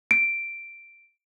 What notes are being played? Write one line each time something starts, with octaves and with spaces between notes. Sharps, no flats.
D7